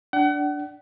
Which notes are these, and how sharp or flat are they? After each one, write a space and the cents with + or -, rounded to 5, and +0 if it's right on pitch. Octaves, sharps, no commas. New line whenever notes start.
D4 -5 F#5 +35